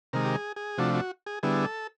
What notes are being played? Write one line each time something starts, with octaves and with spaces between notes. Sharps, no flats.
C3 D#3 G#3 A#4
G4
G#4
G#4
C3 F3 A3 D4 F#4
F#4
G#4
D3 G3 B3 E4 G#4
A4